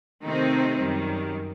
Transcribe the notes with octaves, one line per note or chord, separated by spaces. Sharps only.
C3 D#3 A3 C4 D#4
F#2 D#3 G3